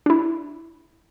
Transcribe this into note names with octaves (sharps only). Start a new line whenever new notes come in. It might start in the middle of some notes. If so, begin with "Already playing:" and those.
D4 E4